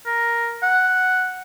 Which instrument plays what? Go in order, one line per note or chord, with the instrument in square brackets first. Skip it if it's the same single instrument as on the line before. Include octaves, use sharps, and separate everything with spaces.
[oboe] A#4
F#5